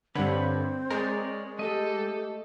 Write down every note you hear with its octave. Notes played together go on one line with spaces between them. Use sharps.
G2 D3 C4 B4 C#5 B5
G#3 A#4 C#5 D5
A3 G4 A4 D#5